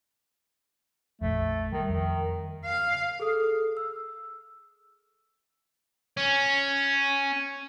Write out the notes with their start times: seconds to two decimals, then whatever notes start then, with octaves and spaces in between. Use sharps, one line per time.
1.22 A#1 F2 A3
1.72 D#3 G3
1.89 F2 D#3
2.65 F5
3.20 G#4 A4 D#6 F6
3.77 E6
6.17 C#4